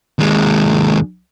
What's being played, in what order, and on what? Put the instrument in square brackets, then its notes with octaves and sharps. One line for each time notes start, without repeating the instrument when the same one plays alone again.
[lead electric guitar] D#2 G#3